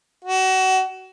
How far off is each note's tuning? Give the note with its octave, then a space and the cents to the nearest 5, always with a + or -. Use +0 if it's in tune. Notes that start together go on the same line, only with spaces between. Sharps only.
F#4 +30